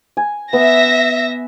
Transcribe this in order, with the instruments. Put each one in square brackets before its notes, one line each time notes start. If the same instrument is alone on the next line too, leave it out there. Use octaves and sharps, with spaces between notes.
[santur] G#5
[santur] B3 [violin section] E5 A#6